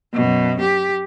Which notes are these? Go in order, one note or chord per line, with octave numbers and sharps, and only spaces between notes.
F#2 B2
G4